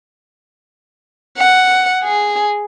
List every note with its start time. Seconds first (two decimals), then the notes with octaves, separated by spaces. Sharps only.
1.38 F#5
2.04 G#4